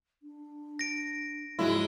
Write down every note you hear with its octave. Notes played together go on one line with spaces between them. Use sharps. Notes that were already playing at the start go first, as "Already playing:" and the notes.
D4
A#6 D7
G#2 F3 F#3 G#3 E4